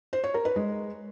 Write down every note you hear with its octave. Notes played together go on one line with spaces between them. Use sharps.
C5
C#5
A#4
B4
G#3